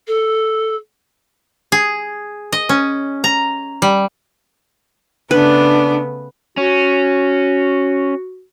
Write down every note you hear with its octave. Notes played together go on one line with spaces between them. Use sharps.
A4
G#4
D#5
C#4
A#5
G3
C#3 A3 B3 D4 B4
C#4 F#4